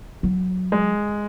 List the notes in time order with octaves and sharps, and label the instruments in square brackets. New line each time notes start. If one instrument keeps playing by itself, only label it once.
[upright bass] F#3
[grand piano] G#3